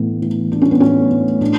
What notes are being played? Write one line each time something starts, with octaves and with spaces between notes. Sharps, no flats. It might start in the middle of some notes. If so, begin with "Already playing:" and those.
Already playing: A2 E3 B3
E3
A2 D4
C#4
B3
A2 C#4
A2
A2 D4